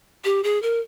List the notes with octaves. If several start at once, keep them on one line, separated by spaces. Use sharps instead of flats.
G4
G#4
A#4